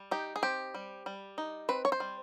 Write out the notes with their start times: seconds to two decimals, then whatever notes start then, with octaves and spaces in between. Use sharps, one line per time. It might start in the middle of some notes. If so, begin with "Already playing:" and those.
Already playing: G3
0.11 D#4 G4
0.36 G#4
0.43 C4 G4
0.74 G3
1.06 G3
1.38 D#4
1.69 C4 B4
1.85 C#5
1.92 C5
2.00 G3